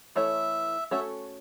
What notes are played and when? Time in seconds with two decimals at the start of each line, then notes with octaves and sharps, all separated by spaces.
0.16 E3 A3 E4 C#5 E5
0.91 A3 C#4 F#4 A4 C#5 E5